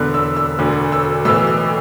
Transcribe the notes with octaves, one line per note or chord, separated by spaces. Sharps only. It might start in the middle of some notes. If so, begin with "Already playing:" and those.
Already playing: E1 E2 D3 F#6
E6
E6
E1 D2 D3
E6
B1 A2 E3 E6
E6